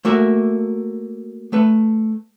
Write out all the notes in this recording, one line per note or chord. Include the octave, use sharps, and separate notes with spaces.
A3 A#3 F#4 E5
A3 B4